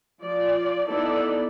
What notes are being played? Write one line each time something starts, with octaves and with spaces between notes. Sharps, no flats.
F3 D5
B3 D#4 E4 A4 D5